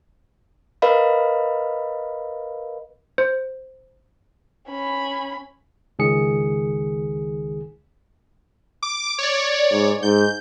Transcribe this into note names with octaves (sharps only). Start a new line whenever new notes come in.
A#4 B4 D#5 F5 B5
C5
C#4 B5
C#2 D#3 G#4 C#7
D6
C#5 D5
G#2
G#2 G6